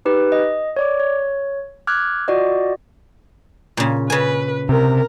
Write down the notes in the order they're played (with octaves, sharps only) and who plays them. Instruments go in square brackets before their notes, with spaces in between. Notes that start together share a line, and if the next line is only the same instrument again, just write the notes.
[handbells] D#4 G4 B4
D#5
C#5 D5 D6
C#5
D6 F6 F#6 G#6
F4 F#4 D5 D#5
[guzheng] A#2 C#3
[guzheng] C#3 G#5 [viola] B4
[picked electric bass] C3 [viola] A#4